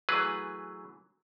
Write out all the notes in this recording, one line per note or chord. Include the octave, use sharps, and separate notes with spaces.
E3 F#3 A3 G#4 B4